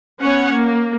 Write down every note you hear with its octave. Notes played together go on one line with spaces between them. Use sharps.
B3 C#4 C#5 F#5
A#3